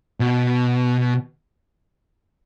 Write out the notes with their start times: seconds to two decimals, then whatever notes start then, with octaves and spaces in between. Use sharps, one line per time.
0.20 B2